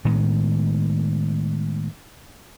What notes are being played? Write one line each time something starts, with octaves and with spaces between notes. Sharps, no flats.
A2 D#3 G#3 B3